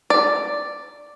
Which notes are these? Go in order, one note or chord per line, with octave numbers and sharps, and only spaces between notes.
D5